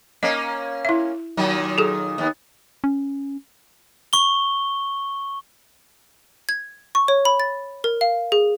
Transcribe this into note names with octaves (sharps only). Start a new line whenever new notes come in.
A#3 C#4 D#5
E4 E5
A#2 D#3 F#3
G#4 A4
D#2 B3
C#4
C#6 G7
G#6
C#6
C#5
B5
A6
A#4
F5
G#4